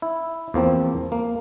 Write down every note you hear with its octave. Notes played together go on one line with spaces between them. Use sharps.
E4
E2 F3 A#3 C4
A#3